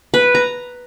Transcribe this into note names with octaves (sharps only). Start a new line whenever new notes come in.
B4
A#5